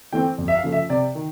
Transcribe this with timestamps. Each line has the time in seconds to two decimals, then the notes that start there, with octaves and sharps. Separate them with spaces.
0.13 E3 A3 C4 G5
0.38 F2
0.48 E5
0.55 F5
0.63 C#3 F3 A3
0.72 E5
0.89 C3 D5
1.15 D#3